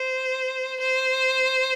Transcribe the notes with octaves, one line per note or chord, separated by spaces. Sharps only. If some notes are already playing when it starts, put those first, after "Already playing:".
Already playing: C5
C5